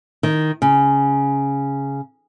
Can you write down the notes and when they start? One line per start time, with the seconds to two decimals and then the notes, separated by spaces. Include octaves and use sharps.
0.23 D#3
0.62 C#3